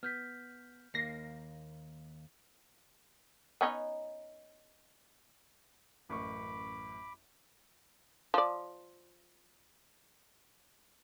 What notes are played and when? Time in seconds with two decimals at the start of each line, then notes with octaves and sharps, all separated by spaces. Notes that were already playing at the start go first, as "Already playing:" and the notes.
0.03 B3 F6 G6 B6
0.94 D#2 A#3 A#6 C7
3.61 B3 C#4 D#4
6.10 A1 F#2 B5 C#6 D6
8.34 F3 D5